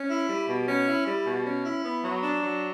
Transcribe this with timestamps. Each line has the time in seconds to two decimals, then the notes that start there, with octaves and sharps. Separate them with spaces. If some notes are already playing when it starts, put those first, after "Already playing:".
Already playing: C#4
0.09 E4
0.28 G3
0.48 B2
0.67 C#4
0.87 E4
1.06 G3
1.26 B2
1.45 C#4
1.65 E4
1.84 B3
2.03 F#3
2.23 D4
2.43 F#3